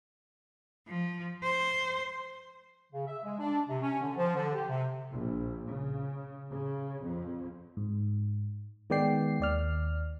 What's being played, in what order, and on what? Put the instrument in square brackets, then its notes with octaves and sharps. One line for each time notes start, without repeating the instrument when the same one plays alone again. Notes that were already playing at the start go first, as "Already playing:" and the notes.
[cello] F3
C5
[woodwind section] C#3
E5
G#3
D4
C3
C#4
D3
F3
D3
G4
C3
[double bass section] A#1
C#3
C#3
F2
[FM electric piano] G#2
D#3 G#3 B3 D5 G5 C7
D#2 D5 F6